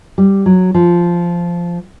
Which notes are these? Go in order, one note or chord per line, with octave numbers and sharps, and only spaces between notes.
G3
F#3
F3